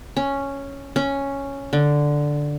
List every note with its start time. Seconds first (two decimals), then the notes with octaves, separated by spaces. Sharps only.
0.17 C#4
0.96 C#4
1.73 D3